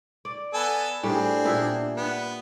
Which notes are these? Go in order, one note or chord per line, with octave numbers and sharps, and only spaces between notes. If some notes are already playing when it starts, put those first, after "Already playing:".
D5
B3 A4 G#5
A2 G3 C4 D4 G#4
A#2 B3 E4
B3 G5